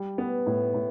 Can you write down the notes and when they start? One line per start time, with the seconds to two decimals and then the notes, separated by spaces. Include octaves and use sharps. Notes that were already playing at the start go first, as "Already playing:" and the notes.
Already playing: G3
0.18 B3
0.46 A2
0.74 A2